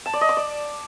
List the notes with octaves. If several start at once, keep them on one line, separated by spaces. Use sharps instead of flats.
A5
D5
D#5
D6
D5